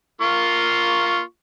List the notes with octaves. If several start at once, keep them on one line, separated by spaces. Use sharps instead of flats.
A#3 F4 C#6